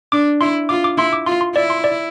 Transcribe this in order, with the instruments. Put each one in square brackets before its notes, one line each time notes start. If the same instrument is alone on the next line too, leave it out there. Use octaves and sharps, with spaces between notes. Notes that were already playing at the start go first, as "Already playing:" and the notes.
[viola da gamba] D4 [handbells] D6
[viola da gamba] E4 [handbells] C6
[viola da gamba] F4 [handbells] D6
[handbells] D6
[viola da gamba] E4 [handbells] C6
[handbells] D6
[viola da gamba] F4 [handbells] C6
[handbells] C6
[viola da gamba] E4 [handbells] D5
[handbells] C6
D5